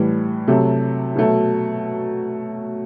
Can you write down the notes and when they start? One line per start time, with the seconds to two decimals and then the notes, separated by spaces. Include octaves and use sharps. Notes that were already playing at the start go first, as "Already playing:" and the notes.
Already playing: A2 E3 G3
0.48 C3 F#3 A3
1.15 B2 F#3 A3